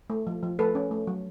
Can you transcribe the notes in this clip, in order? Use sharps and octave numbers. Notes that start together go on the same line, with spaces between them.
A3
F3
F3
A3 A4 B4
C#4
A3
F#3